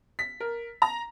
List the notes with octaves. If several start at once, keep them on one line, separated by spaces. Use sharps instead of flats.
B6
A#4
A#5